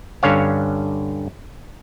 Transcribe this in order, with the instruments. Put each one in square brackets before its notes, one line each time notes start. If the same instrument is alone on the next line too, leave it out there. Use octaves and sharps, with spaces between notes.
[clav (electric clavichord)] G2 D3 C#4 C#5 F5